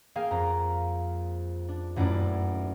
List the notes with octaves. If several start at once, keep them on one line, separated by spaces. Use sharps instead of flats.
A#3 G#4 F5 G5
F2 A#5
D4
D#1 F#2 A3 E4 D5